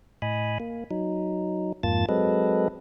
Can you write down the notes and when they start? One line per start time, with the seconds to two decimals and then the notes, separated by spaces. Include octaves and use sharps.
0.22 A2 D#5 G#5 B5
0.60 A#3
0.91 F#3 D#4
1.83 F2 G#2 A#3 F4 A5 A6
2.09 F#3 G#3 C4 A4 B4 D#5